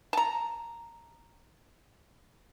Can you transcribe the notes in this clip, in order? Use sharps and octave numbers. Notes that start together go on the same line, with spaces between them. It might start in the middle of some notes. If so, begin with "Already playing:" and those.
A5 A#5